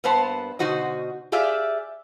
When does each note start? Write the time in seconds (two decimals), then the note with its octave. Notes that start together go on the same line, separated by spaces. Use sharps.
0.04 G2 A#3 B3 B4 C5 A5
0.59 B2 D3 D#4 F#4 C5 D#5
1.32 G4 G#4 D5 E5 F5